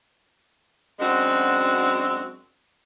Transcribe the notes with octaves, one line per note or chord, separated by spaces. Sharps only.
F#2 G#3 C4 D4 F#4